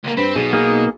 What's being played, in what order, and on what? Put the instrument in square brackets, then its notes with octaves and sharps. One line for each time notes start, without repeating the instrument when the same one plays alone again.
[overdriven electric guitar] C#2 A#3
[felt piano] G2 [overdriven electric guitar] C4 [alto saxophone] B4
[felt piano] B1 [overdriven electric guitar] B2 [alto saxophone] G#4
[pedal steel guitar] A#3 D#4 [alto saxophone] G#4